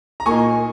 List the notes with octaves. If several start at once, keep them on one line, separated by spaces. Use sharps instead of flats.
A#5
A#2 A#3 D#4 G#5 C#6